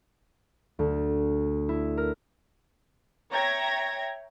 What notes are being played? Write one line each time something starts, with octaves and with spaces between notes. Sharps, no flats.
D2
E4
A#4
C#5 E5 G5 A#5 G#6 A#6